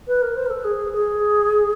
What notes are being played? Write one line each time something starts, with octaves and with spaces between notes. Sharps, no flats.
B4
A#4
C5
A#4
A4
G#4
G#4